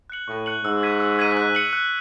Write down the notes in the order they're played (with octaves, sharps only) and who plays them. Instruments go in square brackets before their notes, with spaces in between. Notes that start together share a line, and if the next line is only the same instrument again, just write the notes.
[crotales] F#6 C#7 F#7
[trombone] A2 [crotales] C#6
[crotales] F#6 C#7 F#7
[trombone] G#2 [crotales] E6
[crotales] G#6 B6 D#7
E6
G#6 B6 D#7
F#6
C#7 F#7
F#6